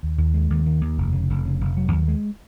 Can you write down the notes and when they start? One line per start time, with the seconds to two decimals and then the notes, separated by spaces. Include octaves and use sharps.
0.03 D#2
0.18 D#2
0.34 G#3
0.50 D#2
0.66 D#3
0.81 D#2
0.98 F1
1.13 C#3
1.29 F1
1.45 C#3
1.60 F1
1.77 F#3
1.92 D#2
2.08 G#3